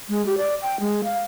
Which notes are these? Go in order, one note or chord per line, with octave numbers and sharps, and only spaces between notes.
G#3
G4
D5
G5
G#3
F5